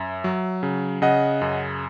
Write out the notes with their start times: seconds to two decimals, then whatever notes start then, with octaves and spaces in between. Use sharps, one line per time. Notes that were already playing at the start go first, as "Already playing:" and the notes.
Already playing: F#2 E5
0.24 F#3
0.63 C#3
1.02 C#3 D#5 F#5
1.41 F#2